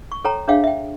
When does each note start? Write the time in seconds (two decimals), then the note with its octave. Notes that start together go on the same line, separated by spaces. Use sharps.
0.12 C#6
0.25 A4 C#5 G5 A#5
0.48 D4 G#4 C#5 E5 F5 G5
0.64 E5 G5